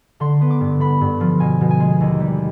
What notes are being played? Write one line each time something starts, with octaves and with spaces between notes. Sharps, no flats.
D3 C6
B3
D6
G2
D3 B5
G2
F3
B2 G#5
B2
G#5
G#3
D#2
G3